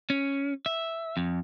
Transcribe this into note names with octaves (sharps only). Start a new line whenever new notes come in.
C#4
E5
F2